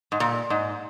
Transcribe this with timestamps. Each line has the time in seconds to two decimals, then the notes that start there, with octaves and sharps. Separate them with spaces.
0.12 G#2
0.20 A#2
0.50 G#2